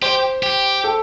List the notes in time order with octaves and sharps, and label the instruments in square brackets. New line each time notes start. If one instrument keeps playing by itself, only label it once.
[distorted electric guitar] G4 [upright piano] C5
[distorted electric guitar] G4
[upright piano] A4